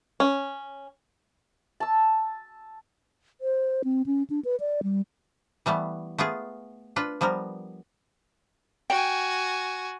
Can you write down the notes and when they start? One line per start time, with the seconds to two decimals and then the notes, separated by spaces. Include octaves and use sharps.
0.20 C#4
1.80 A5 E6
3.41 C5
3.84 C4
4.06 C#4
4.30 D4
4.45 B4
4.60 D5
4.83 G3
5.66 E3 G3 A3 B3
6.18 A3 B3 F4 G#4
6.96 D4 F4 B4
7.21 F3 G3 B3 A#4
8.90 F#4 G5 G#5